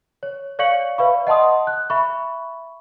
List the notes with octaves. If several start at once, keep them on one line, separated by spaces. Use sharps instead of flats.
C#5
C#5 D5 F5 C#6 C#7 F#7
B4 D5 E5 F5 B5 C#6
D#5 F#5 A5 C6 D#6
F#6
E5 B5 C#6